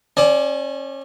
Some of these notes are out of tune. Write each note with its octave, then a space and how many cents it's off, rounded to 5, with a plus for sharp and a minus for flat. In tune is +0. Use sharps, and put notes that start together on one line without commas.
C#4 -30 D5 +5 G#5 +40